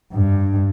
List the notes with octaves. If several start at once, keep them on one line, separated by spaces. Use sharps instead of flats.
G2